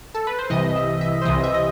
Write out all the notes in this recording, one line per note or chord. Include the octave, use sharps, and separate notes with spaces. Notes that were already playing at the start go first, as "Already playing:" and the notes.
A4
B4
C5
C2 C3 E3 D#5
E5
E5
C5
C2 C3 E3 D#5
E5
D#5